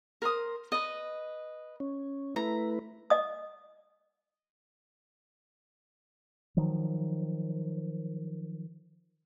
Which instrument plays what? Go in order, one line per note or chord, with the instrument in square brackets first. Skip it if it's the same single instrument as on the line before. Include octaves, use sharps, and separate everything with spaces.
[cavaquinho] A#4 C5 D#6
B4 D#5
[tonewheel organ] C#4
[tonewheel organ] A3 E4 B4 [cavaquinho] A#5
[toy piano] D#5 D#6
[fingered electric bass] D#3 F3 F#3